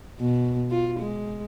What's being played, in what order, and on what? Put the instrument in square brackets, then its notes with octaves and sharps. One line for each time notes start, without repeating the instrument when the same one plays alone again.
[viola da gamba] B2
F4
G#3